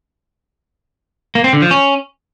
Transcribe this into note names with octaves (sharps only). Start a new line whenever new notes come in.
A#3
C4
D3
F3
C#4